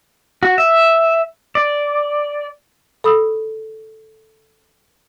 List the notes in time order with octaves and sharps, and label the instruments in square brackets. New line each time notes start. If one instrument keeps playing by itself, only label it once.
[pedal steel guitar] F#4
E5
D5
[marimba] A4 B5 D#6 E6